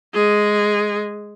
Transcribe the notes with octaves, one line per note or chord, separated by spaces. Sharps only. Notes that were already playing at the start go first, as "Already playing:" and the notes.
G#3 G#4